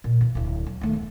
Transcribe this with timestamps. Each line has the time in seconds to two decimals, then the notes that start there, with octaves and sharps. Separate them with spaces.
0.04 A#2
0.21 E2
0.35 D1 E4
0.66 F#3
0.81 D#3 A3
0.93 E2